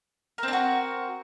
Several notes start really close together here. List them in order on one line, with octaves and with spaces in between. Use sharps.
A#4 C4 D4 F#4